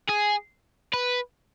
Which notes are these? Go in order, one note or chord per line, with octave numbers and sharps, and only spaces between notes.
G#4
B4